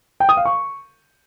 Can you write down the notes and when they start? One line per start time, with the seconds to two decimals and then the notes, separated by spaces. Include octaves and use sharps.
0.20 G5
0.29 D#6
0.37 F5
0.45 C#6